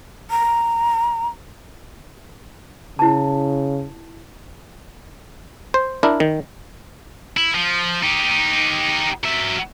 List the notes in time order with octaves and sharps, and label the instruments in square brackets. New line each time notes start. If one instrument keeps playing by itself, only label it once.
[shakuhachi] A#5
[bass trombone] C#3 [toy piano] E4 A5
[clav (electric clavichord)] C5
D4 E4 A#4
D#3
[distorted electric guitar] E4
F3
D#4 G4
F#3 E5